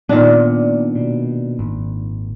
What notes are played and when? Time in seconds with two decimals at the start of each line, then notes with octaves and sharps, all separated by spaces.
0.09 A#2 D#3 B3 D4
0.95 B2
1.59 G#1